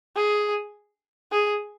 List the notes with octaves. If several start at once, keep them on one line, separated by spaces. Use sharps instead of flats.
G#4
G#4